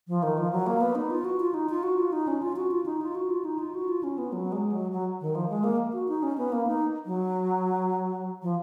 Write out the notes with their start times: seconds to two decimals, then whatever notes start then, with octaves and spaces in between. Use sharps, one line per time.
0.08 F3
0.23 D#3
0.38 F3
0.52 F#3
0.67 A#3
0.81 B3
0.95 D#4
1.10 F4
1.25 F#4
1.40 F4
1.54 D#4
1.69 F4
1.83 F#4
1.98 F4
2.13 D#4
2.28 C#4
2.42 F4
2.56 F#4
2.71 F4
2.86 D#4
3.01 F4
3.15 F#4
3.30 F4
3.45 D#4
3.59 F4
3.75 F#4
3.89 F4
4.03 C#4
4.18 B3
4.33 F#3
4.52 G#3
4.72 F#3
4.92 F#3
5.21 D#3
5.35 F3
5.50 G#3
5.64 A#3
5.93 F#4
6.08 D#4
6.23 C#4
6.38 B3
6.52 A#3
6.67 D#4
7.06 F#3
8.42 F3